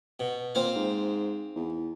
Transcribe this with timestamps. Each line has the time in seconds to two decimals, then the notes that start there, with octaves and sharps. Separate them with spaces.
0.20 B2
0.55 A#2 C4 C5 F5
0.75 G#2
1.55 E2